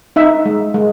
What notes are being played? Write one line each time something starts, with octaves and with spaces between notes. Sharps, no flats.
D#4 E5
G#3
G#3